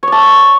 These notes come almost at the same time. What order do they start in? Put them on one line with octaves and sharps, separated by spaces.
C#5 D5 A5